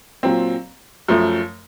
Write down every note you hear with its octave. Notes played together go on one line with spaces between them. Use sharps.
A#2 F#3 C4
F#2 F3 A3